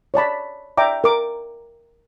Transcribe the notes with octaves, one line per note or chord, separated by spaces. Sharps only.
C#5 D5 A5 B5
D5 E5 G5 A#5 D6
A#4 D6